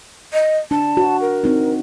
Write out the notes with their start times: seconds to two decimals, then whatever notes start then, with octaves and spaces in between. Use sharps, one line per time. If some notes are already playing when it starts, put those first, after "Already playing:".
0.33 D#5
0.71 D4 A5
0.97 F#4
1.21 A#4
1.44 C4 D#4